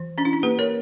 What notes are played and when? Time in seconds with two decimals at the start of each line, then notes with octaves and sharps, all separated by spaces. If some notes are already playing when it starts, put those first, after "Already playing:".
Already playing: E3
0.18 C#4 D4
0.25 E4
0.33 D4
0.43 A#3 G4 B4
0.59 A#4 C#5